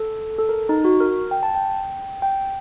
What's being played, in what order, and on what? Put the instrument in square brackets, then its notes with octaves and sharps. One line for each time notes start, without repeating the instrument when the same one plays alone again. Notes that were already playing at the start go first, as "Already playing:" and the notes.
Already playing: [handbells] A4
A4
A#4
D#4
F#4
A#4
G5
A5
G5
G5